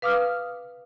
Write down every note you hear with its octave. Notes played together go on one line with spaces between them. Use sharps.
B4 F5 D6 D#6 F6